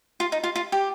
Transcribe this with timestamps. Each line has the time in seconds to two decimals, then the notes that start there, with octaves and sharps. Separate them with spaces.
0.20 F4
0.32 D#4
0.44 F4
0.56 F4
0.72 G4